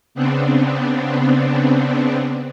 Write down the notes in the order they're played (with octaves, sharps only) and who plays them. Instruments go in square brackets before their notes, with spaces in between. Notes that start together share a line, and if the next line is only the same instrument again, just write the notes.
[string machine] C#3 B3 C4 D4